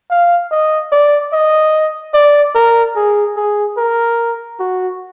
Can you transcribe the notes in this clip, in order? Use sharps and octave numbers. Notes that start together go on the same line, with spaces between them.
F5
D#5
D5
D#5
D5
A#4
G#4
G#4
A#4
F#4